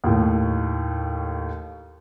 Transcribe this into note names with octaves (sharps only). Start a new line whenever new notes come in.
D#2 A2